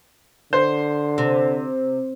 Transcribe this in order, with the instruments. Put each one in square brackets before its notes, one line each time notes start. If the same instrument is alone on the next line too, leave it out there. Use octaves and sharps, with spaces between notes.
[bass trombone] D3 [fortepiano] C5
[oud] C3